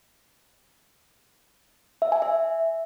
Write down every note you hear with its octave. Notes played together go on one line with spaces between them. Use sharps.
E5
G#5
E5